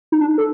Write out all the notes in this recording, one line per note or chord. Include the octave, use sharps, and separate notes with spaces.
D#4
D4
D#4
A4